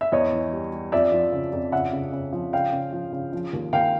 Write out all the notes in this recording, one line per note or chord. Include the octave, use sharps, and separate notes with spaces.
E5
E2 C#5 D#5
E3
G3
G3
F2 D5 E5
F3
C#3
F2
C#3 E5 F#5
C#3
C#3
F3
C#3 F5 G5
C#3
F3
C#3
F3
D#2
D#2 F5 G5